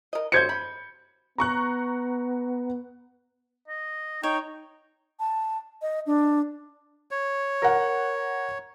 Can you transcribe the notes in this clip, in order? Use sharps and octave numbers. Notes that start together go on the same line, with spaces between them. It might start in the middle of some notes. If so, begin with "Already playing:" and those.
A#4 D#5
F#3 F#4 C5 G6 G#6 C#7
B5
B3 A#5 C#6 F#6
D#5
D#4 C#5 G5
A5
D#5
D4
C#5
A#4 F#5